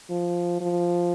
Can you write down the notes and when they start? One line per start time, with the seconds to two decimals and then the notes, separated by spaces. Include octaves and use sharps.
0.10 F3
0.61 F3